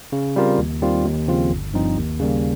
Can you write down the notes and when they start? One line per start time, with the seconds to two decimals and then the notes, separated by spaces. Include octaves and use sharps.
0.12 C#3
0.36 G3 C4 F4 A#4
0.58 D#2
0.82 D#3 G3 C4 F4
1.05 D#2
1.28 C#3 F3 C4 F4
1.51 G1
1.74 G2 F3 C4 D#4
1.97 D#2
2.20 C#3 G3 A#3